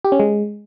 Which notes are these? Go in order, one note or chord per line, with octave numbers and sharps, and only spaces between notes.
G4
C#4
G#3